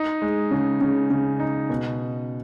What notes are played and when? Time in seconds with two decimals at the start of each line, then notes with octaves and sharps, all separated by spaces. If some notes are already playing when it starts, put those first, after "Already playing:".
Already playing: D#4
0.22 G#3
0.51 C#3
0.81 C#3
1.10 C#3
1.40 D#4
1.70 B2